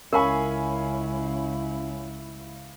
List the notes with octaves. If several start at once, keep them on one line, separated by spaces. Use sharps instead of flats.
C#2 C#4 E4 A#4 F5 G#5 B5 C#6